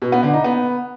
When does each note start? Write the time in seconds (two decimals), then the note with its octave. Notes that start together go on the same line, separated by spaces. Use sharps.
0.02 B2
0.12 B3
0.23 D3
0.34 D#4
0.44 B3